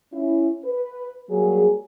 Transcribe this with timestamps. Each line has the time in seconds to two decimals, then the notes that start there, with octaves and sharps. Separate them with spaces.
0.14 C#4 E4
0.65 B4
1.30 F#3 G3 A#3 G#4